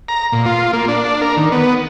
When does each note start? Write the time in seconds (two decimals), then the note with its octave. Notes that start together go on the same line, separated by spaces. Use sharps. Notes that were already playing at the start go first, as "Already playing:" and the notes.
0.08 A#5
0.32 A#2
0.46 F4
0.73 A#3
0.88 D4
1.22 A#4
1.37 D#3
1.52 B3